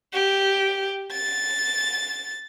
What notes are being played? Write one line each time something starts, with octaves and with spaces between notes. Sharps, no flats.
G4
A6